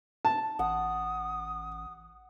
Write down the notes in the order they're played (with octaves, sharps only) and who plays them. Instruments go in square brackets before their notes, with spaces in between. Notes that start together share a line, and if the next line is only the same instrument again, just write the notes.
[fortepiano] A5
[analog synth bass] A1 [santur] F#5 [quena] D#6